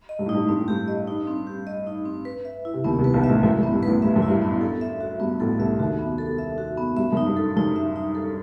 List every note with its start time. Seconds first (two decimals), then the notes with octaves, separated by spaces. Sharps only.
0.09 D#5
0.19 G2
0.26 A2
0.29 D#4
0.34 G2
0.48 G2 C4
0.59 A2
0.68 G2 G4
0.88 D#5
1.08 D#4
1.27 C4
1.47 G4
1.67 D#5
1.87 D#4
2.06 C4
2.25 B4
2.45 E5
2.65 E4
2.74 C3
2.84 D#2 D#3 B3
2.99 C2 C3
3.04 B4
3.14 B1 B2
3.24 E5
3.29 A1 A2
3.43 F#2 E4
3.58 F#2
3.63 A2 B3
3.73 G2
3.83 A1 A2 B4
4.02 G2 E5
4.16 F#2
4.22 E4
4.28 G2
4.42 B3
4.61 A4
4.81 E5
5.01 F#4
5.20 G2 B3
5.40 A1 A2 A4
5.59 C2 C3 E5
5.79 D#2 D#3 F#4
5.99 B3
6.18 A4
6.38 E5
6.58 F#4
6.77 B3
6.97 G2 E5
7.12 F#2
7.17 D#4
7.26 G2
7.36 A4
7.57 F#2 D#4
7.76 E5
7.96 D#4
8.15 A4